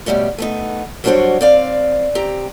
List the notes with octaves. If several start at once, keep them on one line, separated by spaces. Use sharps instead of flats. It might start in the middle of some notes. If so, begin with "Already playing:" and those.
B2 E3 G3 A3 C#4
A3 B3 D#4
F#3 G3 D4 F#4 C5 C#5
C4 D5 F5
C4 G4 A#5